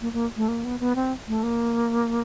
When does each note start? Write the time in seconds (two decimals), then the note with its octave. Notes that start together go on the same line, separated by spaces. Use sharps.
0.01 A#3
0.13 A#3
0.37 A3
0.48 A#3
0.64 B3
0.80 B3
0.96 C4
1.28 A3
1.43 A#3